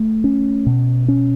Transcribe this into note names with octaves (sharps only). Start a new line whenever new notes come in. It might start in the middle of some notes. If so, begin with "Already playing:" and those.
Already playing: A3
C#4
B2
C#4